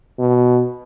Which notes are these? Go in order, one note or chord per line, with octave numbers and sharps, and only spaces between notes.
B2